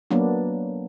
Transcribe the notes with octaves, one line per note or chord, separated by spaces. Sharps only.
F#3 A#3 B3 D4